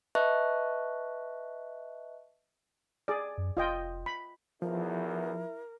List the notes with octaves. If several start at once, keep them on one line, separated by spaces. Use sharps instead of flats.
B4 D#5 E5 A5 C#6 F#6
G#4 D5
F#2
F1 F4 D#5 G5
B5
B1 E2 F3 E4 A#4